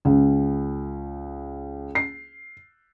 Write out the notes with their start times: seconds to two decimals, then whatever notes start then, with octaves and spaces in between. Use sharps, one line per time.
0.05 C#2
1.95 C7